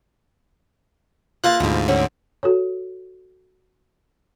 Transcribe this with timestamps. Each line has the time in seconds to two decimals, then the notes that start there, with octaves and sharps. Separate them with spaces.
1.44 E3 A#3 F4 G#4 F#6 A6
1.60 D2 G#2 B2 F3
1.88 D3 C4 C#4 G#4
2.43 F#4 A4 C#5